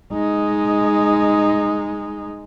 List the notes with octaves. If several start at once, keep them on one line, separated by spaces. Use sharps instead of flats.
G#3 D#4